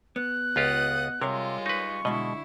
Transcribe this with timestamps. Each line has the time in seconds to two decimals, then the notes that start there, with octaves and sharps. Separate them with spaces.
0.16 B3 F#6
0.56 C#2 F4 G4 D#5 F#5 D#6
1.22 C3 G3 G#3 F4 A#4 C#5 F5
1.66 D#4 B4 C#6
2.05 B1 B2 D3 G#3 E4 D#5